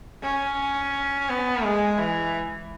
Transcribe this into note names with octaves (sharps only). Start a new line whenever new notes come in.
C#4
B3
G#3
E3